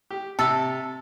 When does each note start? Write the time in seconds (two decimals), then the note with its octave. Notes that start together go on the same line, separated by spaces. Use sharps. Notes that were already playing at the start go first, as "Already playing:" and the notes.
0.11 G4
0.39 C3 A4 E6